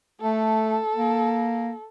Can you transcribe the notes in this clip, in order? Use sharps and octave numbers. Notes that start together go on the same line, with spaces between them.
A3 A4
A#3